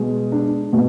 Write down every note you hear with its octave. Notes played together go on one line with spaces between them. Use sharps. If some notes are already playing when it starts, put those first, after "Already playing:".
Already playing: B2 G#3
D4
B2